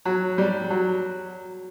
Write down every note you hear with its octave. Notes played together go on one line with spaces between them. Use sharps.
F#3
G3
F#3